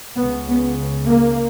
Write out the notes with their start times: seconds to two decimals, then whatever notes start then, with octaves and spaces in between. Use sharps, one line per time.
0.17 C#2 C#3 B3
0.48 B3
1.07 A#3